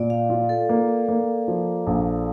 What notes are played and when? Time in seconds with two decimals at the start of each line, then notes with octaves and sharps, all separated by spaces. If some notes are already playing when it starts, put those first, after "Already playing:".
Already playing: A#2 D5
0.10 F5
0.30 F4
0.49 A4
0.69 A#3
1.08 A#3
1.48 F3
1.87 A#1